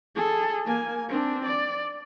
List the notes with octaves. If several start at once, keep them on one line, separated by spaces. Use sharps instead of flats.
G#4 A4
A#3 G#5
C4 D4
D5